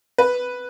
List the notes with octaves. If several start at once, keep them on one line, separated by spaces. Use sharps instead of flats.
B4